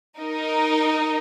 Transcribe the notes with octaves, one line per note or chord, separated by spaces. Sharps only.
D#4 A#4 D#5